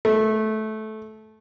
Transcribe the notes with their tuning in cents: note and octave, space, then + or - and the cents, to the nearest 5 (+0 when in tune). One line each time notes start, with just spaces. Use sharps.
A3 -15